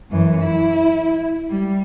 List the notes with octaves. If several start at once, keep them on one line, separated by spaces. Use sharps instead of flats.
F#2 E3
E4
G3